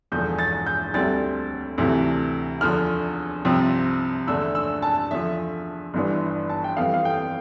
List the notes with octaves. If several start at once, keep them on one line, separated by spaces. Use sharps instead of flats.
E1 E2 D3 F3 G6
A6
G6
D2 D3 G3 C4 A6
D2 C3 E3 A3
E2 D3 F3 F6
C2 C3 F3 C4
E2 D3 A3 D4 E6
E6
A5
E2 D3 F3 E5
G1 G2 E3 B3 D4
A5
G5
F2 E3 G3 B3 F5
F5
G5